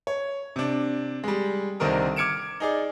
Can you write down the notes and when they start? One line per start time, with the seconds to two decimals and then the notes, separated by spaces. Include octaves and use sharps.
0.07 C#5
0.56 C3 D4
1.24 G3 G#3
1.80 C2 D3 D#3 C4 A#4 D#6
2.16 D6 F6 G#6 C#7 D7 E7
2.60 D#4 G#4 D5